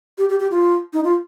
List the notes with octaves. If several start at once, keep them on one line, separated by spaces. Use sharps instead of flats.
G4
G4
G4
F4
D#4
F4